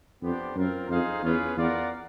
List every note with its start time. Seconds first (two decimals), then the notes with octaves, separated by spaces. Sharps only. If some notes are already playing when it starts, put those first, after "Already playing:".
0.22 F2 B3 D4 G4 C5
0.55 F#2 C4 F4 A#4
0.89 F2 D#4 G#4 C5 F5
1.23 E2 C#4 F4 G#4 B4
1.56 E2 F4 A#4 D5 F#5